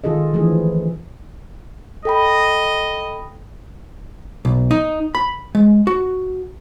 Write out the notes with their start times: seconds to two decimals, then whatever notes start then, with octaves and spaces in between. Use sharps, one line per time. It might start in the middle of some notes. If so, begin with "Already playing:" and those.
0.04 D#3 F4 G#4 A4 D#5
0.34 D3 E3 F3 A3 G#4
2.05 A4 D#5 G5 B5
4.45 B1
4.71 D#4
5.15 B5
5.55 G#3
5.87 F#4